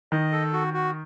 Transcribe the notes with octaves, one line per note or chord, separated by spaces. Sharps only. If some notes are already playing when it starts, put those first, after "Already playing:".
D#3 D#5
A4
F#4
F#4